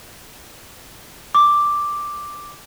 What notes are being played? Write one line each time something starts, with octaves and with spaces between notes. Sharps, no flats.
D6